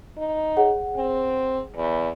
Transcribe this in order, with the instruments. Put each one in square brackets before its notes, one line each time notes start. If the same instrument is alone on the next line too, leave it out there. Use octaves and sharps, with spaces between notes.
[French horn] D#4
[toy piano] G#4 C#5 F#5
[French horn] C4
E2